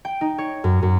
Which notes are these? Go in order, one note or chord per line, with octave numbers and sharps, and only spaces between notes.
G5
D#4
C#5
F#2
F#2